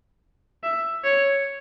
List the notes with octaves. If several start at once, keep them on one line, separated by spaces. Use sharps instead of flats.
E5
C#5